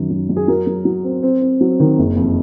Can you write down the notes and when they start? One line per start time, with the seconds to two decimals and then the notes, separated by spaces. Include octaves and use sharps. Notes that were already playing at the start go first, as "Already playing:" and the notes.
Already playing: F#2 D#3
0.10 F#2
0.29 F#2
0.37 G#4
0.48 F#3 A#4
0.67 F#3
0.85 F#3
1.04 C4
1.23 C4
1.41 C4
1.61 F#3
1.80 D#3
1.99 F#1
2.17 F2